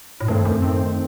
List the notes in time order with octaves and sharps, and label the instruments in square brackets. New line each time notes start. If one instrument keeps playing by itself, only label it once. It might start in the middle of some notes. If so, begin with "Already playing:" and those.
[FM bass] A2
[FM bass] G2 [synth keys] D#3 A3 C4
[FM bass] F#2
[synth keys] D#3 A3 C4